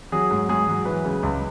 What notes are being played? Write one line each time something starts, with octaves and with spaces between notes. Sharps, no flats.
F#3 G#4
G#2
G#2 G#4
F#3
E3 B4
C#3
C#2